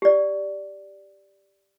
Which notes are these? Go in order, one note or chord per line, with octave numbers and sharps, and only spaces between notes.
G4 D5